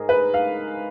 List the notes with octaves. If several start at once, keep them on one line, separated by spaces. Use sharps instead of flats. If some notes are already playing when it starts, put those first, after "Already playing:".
Already playing: G#2 G#4 A#4
B4
F5